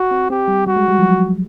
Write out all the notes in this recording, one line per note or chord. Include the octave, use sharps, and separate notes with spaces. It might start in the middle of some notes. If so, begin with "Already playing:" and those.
Already playing: F#4
C4
C4 G4
G3
G3 F#4
G#3
G3
F3
F#3